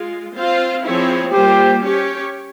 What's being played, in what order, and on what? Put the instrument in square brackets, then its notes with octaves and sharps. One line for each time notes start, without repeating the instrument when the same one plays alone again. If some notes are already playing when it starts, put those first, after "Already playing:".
Already playing: [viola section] G#3 F4
C4 F4 C5 F5
F3 C4 E4 G#4 C#5
[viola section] G3 A#3 F4 C5 [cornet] G4
[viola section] C#4 G4 C#5